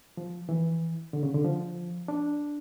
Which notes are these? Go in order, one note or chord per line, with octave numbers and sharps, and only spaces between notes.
F3
E3
D3
C#3
D3
F3
D4